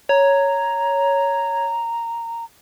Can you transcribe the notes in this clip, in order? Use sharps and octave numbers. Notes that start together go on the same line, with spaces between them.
C#5 A#5